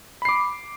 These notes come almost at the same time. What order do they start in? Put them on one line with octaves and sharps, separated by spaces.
B5 C7 D6